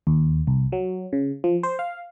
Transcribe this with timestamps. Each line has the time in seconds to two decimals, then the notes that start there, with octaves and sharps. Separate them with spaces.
0.07 D#2
0.47 C2
0.72 F#3
1.13 C#3
1.44 F3
1.63 C5
1.79 F5